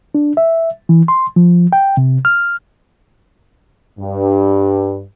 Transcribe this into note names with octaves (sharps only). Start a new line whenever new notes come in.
D4
E5
E3
C6
F3
G5
C3
F6
G2